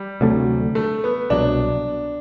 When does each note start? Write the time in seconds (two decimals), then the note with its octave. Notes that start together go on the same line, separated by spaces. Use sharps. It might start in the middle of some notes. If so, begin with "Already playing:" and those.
Already playing: G3
0.21 D2 C3 F#3 A3
0.75 A3
1.04 B3
1.30 C2 B2 F#3 D4